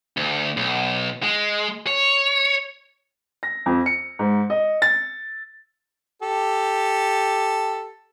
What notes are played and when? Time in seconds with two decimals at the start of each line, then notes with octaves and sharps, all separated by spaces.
0.17 D2
0.57 B1
1.23 G#3
1.87 C#5
3.43 A#6
3.66 F2
3.86 C#7
4.19 G#2
4.50 D#5
4.82 A6
6.22 G4 A4